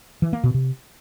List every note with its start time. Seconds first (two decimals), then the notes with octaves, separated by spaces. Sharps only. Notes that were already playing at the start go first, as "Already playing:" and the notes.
0.22 E3
0.33 A#3
0.44 B2
0.54 C3